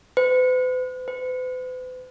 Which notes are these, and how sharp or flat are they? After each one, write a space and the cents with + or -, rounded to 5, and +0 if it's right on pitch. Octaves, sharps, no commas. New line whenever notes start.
B4 +45
B4 +45